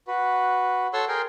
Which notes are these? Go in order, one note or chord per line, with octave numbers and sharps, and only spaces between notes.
F#4 B4
A4 C#5 F#5 C6 C#6 E6
G#4 A#4 G5 C6